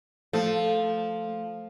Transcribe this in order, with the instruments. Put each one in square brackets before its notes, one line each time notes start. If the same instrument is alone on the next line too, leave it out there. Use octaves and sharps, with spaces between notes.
[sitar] F3 [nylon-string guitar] A3